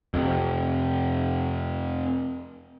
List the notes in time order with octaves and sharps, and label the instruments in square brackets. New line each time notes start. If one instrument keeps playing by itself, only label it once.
[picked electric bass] F2 C3